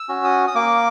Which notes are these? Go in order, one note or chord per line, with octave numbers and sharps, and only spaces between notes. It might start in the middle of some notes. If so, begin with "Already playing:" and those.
Already playing: E6
C#4 F#4
D#6
D#6
A#3 D6